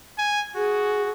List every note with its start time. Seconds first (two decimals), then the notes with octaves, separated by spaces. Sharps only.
0.18 G#5
0.56 F#4 G#4